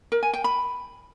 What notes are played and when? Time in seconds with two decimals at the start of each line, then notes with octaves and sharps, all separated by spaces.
0.12 A#4
0.23 G#5
0.34 G5
0.44 B5